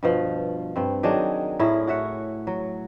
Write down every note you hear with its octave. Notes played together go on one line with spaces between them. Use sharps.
G2 B2 F3
G2 C4
D#3 F#3 D4 G#4
A2 E4 G#4 A#4
F#4 C#5 E5 F#5
F#3